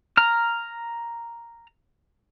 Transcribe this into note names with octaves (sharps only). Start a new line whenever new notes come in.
A#5 F6